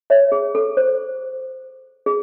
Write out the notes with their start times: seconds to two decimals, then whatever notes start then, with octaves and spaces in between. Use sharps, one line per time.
0.10 C#5 E5
0.32 G#4
0.55 A4
0.77 C5
2.06 G#4